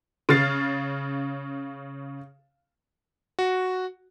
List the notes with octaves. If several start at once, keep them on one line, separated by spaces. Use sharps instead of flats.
C#3 F6 A6 C7
F#4